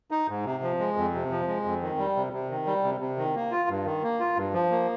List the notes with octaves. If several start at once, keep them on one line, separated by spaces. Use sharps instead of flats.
D#4
G#2
C3
F3
G#3
F2
C3
F3
G#3
F2
D#3
G3
C3
C3
D#3
G3
C3
C3
D#3
A#3
F4
G2
D#3
A#3
F4
G2
F3
A#3